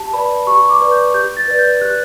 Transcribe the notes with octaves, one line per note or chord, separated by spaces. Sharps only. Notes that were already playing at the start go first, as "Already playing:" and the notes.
Already playing: G4 A5
B4 D5 B5
G4 C#6
D6
B4 D5
G6
G4 G6
A6
B4 D5
G6
G4 F#6